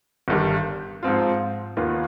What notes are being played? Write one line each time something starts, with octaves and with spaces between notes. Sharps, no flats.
G1 G2 D#3 G3
G#2 F3 C4 F4
D#2 D#3 B3 F4